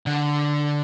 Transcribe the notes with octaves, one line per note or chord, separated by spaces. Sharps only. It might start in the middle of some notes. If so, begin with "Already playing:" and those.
D3